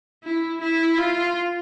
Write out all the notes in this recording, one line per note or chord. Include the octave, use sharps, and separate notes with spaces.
E4
E4
F4